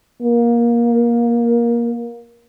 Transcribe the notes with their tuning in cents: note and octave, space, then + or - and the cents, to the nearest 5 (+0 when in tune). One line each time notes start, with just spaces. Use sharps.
A#3 +20